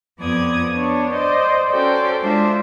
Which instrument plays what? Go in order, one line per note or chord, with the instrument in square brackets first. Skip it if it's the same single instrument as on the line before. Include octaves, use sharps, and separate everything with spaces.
[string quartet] F2 B3 D5 D#6 G#6
B3 D4 C#5
C5 D5 D#5
C#4 F#4 A4 C5 D5 G5
G#3 D4 F4 C5 E5